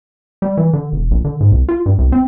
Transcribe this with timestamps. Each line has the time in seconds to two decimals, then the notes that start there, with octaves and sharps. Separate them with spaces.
0.42 G3
0.57 E3
0.73 D3
0.92 E1
1.11 A#1
1.25 D3
1.40 G#2
1.52 C2
1.69 F4
1.86 G2
1.98 C2
2.12 C4